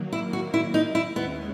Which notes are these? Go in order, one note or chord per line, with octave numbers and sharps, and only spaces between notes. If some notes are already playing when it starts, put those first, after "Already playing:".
Already playing: D#3 F#3 A#3
E4
F#4
E4
D#4
E4
D#2 D#3 G#3 B3 C#4